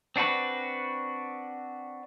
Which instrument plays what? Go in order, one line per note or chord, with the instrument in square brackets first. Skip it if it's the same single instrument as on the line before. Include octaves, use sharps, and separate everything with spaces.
[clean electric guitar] C4 D4 F#4 B4